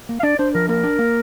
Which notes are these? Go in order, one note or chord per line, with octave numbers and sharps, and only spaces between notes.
A#3
F5
D4 D5
D4 C5
F3 A#4
A#3 A#4
D4
A#3